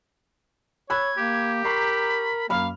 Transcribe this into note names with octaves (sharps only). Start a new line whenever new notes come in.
C#5 B5 E6 F#6 G#6
A#3 G4
A#4 A#5 B5 C#6 C7
F#2 A#3 F5 B5 F6